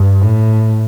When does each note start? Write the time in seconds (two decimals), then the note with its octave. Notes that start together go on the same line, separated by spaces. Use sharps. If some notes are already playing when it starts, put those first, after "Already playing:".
Already playing: G2
0.22 A2